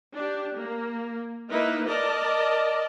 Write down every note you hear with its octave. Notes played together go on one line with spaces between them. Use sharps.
D4 G4
A#3
A#3 D#4 E4 B4
A#4 D5 D#5 A5